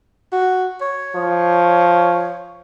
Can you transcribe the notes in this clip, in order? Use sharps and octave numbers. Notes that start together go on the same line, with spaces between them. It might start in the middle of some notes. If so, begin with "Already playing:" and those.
F#4
C#5
F3